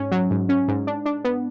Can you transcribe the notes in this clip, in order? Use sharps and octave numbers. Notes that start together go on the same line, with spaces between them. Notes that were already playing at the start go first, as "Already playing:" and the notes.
Already playing: G#2 C#4
F#3
G#2
C#4
G#2
D4
D4
B3